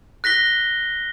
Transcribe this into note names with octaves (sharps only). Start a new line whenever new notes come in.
F#6 A#6 B6 G7